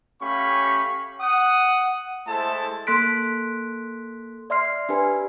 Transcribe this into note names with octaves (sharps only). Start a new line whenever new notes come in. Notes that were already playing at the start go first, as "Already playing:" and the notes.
A3 C#4 G4 F5 B5 C#6
F#5 D#6
G#3 A3 E4 A4 C5 A5
A#3 A4 C6 F#6 B6 D7
D5 E5 C6 F6 C7
D4 G4 B4 G#5